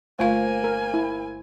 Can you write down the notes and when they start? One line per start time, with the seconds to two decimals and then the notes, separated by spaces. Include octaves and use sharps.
0.19 G1 A3 A#3 F4 C5 F5 G#5
0.64 A#4
0.94 E4